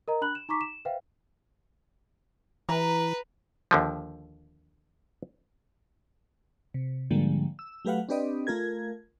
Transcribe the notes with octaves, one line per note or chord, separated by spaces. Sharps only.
A#4 D#5 A#5
D4 B5 F#6 F#7
E7
D#4 A#5 C#6 D6 B6
E7
B4 C5 E5 F5 G5
E3 B4 A#5
D#2 D3 F3
C3
G#2 D3 F3 G3 G#3 A#3
E6
F#3 A3 G4 B4 F5 F#5
C4 D4 G4 B4 D5 D#5
A3 F4 A#4 G#6